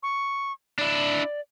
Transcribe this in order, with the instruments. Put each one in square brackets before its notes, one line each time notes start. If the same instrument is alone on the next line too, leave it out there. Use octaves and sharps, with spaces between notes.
[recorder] C#6
[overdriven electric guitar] D4 E4 [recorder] D5